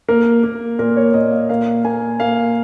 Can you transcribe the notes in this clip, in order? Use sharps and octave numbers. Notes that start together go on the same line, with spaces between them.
A#3 A#4
A#3
A#2 A#4
C#5
A#2 D#5
F5
A#3 F5
A#3 G#5
A#3 F5